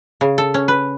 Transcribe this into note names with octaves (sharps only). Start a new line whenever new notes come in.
C#3
A4
C#4
B4